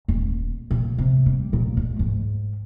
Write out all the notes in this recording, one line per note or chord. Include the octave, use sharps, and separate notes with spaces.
D#1
A#2
C3
G3
A#2
G#3
G#2